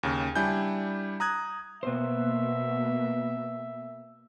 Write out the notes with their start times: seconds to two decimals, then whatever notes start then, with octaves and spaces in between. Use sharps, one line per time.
0.03 D#2 C#3
0.36 G3 D4 E4 G#5 G6
1.20 A#5 D#6 F#6 G#6
1.83 B2 A#3 B3 C5 E5